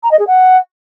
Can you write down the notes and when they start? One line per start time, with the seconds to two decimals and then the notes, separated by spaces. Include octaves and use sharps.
0.03 A#5
0.11 D#5
0.19 G#4
0.27 F#5